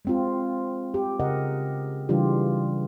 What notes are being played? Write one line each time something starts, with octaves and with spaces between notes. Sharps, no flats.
G#3 C4 F4
G4
C#3 A#4 D#5 F#5
C#3 E3 G3 D4 F4 G4